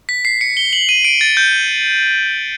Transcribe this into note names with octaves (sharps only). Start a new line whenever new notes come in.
B6
C7
C#7
G7
F#7
D#7
D7
A6
G6